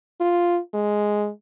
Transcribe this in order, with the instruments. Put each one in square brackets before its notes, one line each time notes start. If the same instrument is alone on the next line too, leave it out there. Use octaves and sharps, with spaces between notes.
[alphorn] F4
G#3